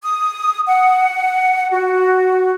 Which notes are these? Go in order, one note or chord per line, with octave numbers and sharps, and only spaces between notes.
D#6
F#5
F#4